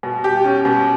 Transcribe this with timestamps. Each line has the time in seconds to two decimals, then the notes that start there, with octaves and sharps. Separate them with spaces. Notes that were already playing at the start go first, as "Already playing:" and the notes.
0.03 B2
0.24 G4
0.44 C#4
0.65 B2